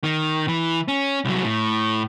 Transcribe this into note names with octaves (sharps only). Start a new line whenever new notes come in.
D#3
E3
C#4
C2 F#3
A2